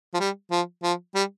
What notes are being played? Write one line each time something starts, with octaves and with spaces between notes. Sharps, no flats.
F3
G3
F3
F3
G3